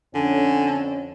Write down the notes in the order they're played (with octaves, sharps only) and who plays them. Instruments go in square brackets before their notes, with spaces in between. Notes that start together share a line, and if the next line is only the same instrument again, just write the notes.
[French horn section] F2 C#4 [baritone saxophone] D3 [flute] G#5